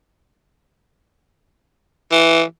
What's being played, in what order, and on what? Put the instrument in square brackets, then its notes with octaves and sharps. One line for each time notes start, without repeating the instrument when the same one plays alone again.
[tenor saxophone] E3